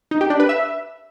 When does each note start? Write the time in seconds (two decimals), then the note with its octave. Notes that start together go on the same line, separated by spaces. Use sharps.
0.11 D#4
0.21 G4
0.30 D4
0.40 B4
0.49 E5